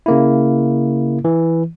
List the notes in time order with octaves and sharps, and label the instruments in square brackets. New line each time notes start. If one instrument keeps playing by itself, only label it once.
[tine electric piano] C#3 A#3 E4
E3